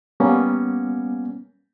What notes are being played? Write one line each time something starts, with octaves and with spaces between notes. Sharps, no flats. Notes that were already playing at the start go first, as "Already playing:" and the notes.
G3 A#3 B3 C#4